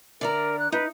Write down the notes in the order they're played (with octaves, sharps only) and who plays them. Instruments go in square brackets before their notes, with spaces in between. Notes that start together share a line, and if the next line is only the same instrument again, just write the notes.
[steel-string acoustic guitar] D3 D5 A#5 [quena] A#4
[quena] F#6
[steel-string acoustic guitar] D#4 [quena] B4